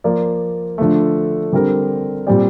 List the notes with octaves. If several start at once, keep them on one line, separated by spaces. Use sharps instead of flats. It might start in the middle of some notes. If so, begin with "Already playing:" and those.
F3 A#3 F4 A#4 D5
D3 F3 A3
D3 G3 C4 G4 A#4
A#2 G3 C4 G4 D5